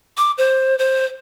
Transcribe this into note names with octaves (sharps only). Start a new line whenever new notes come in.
D6
C5
C5